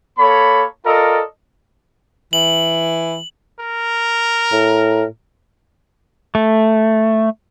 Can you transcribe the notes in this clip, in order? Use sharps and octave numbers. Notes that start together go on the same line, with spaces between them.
A#3 A4 C#5 B5
F4 A4 A#4 D5 D#5
E3 F#7
A#4
A2
A3